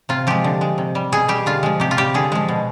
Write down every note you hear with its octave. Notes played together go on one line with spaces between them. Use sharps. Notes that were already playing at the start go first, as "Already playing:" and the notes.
C3 F4
F3 G#3 G4
D3
G#3
C3
G3
B2 G#4
G3 G4
D3 F4
F3 G#3
C3 G4
F4
G3 G4
D3 G#4
F3 G#3
B2